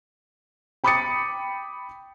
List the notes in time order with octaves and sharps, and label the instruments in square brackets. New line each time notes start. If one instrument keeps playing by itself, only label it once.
[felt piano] G5 B5 D6 D#6 A6 C#7